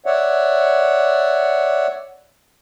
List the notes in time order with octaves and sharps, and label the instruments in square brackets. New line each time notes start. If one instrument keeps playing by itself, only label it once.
[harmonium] C#5 D5 E5 F#5